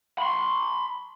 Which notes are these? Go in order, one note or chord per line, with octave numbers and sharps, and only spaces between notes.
B5 C6